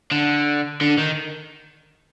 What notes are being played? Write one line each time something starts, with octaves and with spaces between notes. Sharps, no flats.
D3
D3
D#3